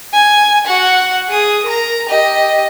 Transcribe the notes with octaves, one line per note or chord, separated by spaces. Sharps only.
G#5
F#4 F#5
G#4 D#6
A#4 A#5
G4 D#5